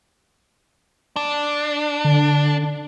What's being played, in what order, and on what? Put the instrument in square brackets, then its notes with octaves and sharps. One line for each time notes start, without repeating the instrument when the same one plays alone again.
[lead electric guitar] D4
[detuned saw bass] D3